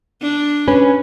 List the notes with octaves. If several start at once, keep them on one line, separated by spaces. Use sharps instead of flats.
D4
C#4 B4